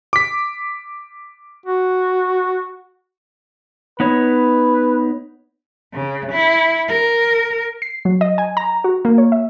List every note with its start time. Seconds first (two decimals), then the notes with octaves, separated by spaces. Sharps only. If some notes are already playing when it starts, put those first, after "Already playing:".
0.13 D6 B6
1.66 F#4
4.00 B3 D#4 B4 C#5
5.94 C#3
6.32 E4
6.89 A#4
7.82 C7
8.05 F#3
8.21 D#5
8.38 G#5
8.57 A#5
8.84 F#4
9.05 A#3
9.18 C#5
9.32 E5